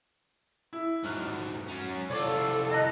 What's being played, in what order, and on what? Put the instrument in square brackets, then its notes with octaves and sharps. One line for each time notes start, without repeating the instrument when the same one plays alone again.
[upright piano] E4
[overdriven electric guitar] G#2 F#3 [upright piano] F6 F#6
[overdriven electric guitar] F#3 C#4
[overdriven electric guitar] C2 F4 [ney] A4 [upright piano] C#5 D5 D6
[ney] D#5 [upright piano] A5 A#5 F#6